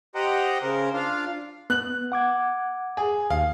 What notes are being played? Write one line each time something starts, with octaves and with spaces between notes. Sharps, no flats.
G4 C5 D#5 F#5 G5 A#5
C#3 A#4 C5
D4 F4 F5
B3 F#6 F#7
F#5 D6 G#6
G#4
D#2 F5